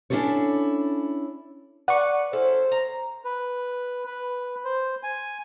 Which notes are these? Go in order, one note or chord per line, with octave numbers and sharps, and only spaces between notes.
C#4 D4 E4 G4 A4 C#5
B4 D5 F#5 C#6
C#4 E4 A4 C5
A#5
B4
B4
C5
G#5